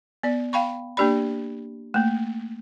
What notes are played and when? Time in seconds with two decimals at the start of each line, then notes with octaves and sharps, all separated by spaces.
0.23 B3 D5
0.53 F5 G5 B5 C#6
0.97 A#3 D4 G4 D5 B5
1.94 A3 A#3